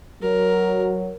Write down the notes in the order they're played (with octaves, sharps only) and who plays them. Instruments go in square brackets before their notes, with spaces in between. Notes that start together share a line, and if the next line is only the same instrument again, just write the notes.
[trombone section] F#3 [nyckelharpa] A#4